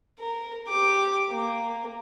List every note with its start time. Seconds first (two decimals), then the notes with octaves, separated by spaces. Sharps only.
0.19 A#4
0.68 G4 D6
1.29 A#3